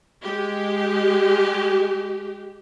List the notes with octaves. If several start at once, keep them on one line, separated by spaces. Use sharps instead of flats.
G#3 G4